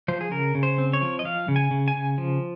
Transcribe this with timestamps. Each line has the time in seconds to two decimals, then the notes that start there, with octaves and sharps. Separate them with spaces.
0.08 F3 C5
0.21 G#4
0.31 C#3 A#4
0.55 C#3
0.63 C5
0.78 C4
0.93 C#5
1.02 F3
1.19 D#5
1.25 F3 F5
1.48 C#3
1.56 G#5
1.71 C#3
1.88 G#5
1.95 C#3
2.18 F3